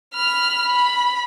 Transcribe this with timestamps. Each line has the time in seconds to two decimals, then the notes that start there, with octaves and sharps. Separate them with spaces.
0.14 B5 F6
0.66 B5